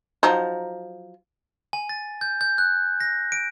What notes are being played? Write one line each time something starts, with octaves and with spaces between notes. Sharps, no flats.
F3 F#3 D#4
G#5
A6
G6
G6
F#6
A#6
D7